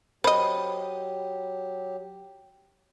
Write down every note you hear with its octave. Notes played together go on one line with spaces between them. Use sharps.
F#3 G4 C5 D#5 B5